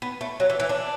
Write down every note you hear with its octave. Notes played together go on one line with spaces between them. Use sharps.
B3
A3
F#3
E3
E3
D4